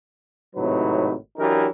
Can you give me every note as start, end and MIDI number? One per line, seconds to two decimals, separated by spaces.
0.56 1.13 32
0.56 1.13 45
0.56 1.13 48
0.56 1.13 54
0.56 1.13 63
0.56 1.13 71
1.38 1.67 52
1.38 1.67 54
1.38 1.67 62
1.38 1.67 63
1.38 1.67 67
1.38 1.67 70